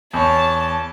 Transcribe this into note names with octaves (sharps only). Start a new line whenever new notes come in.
E2 C#5 A5